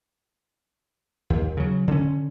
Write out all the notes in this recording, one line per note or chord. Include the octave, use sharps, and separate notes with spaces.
D#2
C#3 F#3
D3 C#4